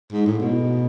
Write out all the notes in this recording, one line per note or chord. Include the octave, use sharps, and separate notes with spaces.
G#2
A2
B2